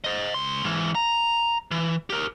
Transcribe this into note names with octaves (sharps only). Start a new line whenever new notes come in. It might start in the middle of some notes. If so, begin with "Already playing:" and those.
C5 D#5
C#2 C6
G#2 E3
A#5
E3
G4 A#4